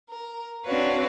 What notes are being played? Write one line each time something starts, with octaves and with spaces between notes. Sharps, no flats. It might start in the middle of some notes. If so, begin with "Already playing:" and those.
A#4
C4 D4 F#4 B4 C#5 F5